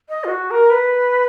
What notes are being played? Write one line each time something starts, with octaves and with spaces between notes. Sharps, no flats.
D#5
F4
F#4
A#4
B4